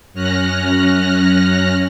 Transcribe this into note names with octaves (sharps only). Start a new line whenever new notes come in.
F#2 C#4 F6 F#6 A#6